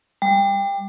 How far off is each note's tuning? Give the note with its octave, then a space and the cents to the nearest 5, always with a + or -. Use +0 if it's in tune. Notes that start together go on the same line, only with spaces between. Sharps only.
G3 +20